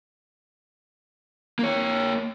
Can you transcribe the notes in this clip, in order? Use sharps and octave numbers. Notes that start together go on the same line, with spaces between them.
A#3 C#5